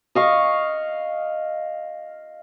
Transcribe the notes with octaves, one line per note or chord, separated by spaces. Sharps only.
D#5 F5 C#6